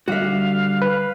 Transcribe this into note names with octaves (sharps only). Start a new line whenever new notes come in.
D3 G3 F#4 D5 E5 F5
B4